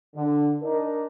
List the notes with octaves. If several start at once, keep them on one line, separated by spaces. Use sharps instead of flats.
D3
D4 D#4 A#4